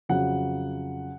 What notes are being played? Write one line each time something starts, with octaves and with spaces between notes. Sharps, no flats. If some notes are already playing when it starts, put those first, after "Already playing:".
F2 C#3 F#3 F#5